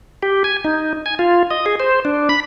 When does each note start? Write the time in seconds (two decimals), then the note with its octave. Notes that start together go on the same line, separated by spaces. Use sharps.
0.23 G4
0.44 G#5
0.64 D#4
1.06 G#5
1.19 F4
1.51 D#5
1.66 G#4
1.80 C5
2.05 D4
2.29 B5